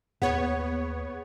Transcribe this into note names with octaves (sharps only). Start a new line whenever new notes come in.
D#2 B3 G#4 C#5 F#5